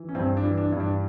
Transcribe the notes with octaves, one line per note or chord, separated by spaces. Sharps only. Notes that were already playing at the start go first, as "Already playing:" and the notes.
Already playing: E3
C#4
G2 C4
D4
E3
D4
G2
D4